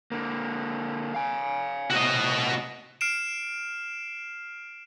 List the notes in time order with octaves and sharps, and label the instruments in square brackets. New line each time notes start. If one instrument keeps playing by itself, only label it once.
[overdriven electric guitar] D3 A#3
F5 G#5
[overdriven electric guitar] A2 C3 [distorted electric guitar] F#4 D#5
[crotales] F6 C7 D7 E7